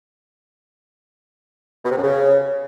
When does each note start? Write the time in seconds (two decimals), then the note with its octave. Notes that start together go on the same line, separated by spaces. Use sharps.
1.85 B2
1.91 C3
1.97 F#2
2.03 C#3